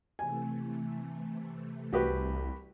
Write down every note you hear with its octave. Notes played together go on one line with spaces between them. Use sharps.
C3 E3 A3 G#5
C2 F#4 G4 B4